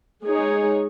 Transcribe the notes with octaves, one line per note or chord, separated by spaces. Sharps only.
G#3 D#4 G#4 C#5